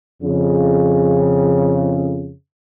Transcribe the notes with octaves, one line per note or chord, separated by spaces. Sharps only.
F2 C#3